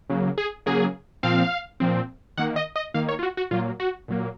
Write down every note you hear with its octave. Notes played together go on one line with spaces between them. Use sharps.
C#3 F#3 A#3
G#4
C#3 F#3 A#3 G#4
A#2 F3 C4 F5
A#2 F3 C4
D#3 A#3 F#5
D#5
D#5
D#3 A#3 F5
C#5
F4
F#4
F#4
A#2 F#3 A#3 F4
F#4
A#2 F#3 A#3